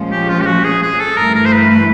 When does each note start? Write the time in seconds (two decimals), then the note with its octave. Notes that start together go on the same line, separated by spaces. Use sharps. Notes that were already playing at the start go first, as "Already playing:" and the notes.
Already playing: A#2 F3 G#3 C#4
0.11 G4
0.29 F4
0.41 G4
0.46 F#4
0.65 G#4
0.82 G#4
1.00 A4
1.17 G2 E3 A3 A#4
1.35 A#4
1.46 C5
1.53 B4
1.70 B4